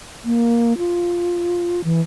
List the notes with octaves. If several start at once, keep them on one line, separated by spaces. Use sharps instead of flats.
A#3
F4
E3